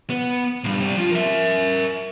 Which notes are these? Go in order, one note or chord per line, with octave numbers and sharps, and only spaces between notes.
B3
B1 G2
G3 C4
F3
A#4 E5